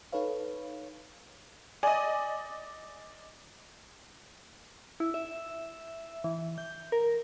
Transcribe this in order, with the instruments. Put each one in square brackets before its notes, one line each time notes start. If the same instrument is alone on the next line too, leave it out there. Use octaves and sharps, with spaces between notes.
[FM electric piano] D#4 A4 B4 C#5 F5
[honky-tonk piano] D5 D#5 [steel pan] G#5
[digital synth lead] E4
E5
E3
G6
A#4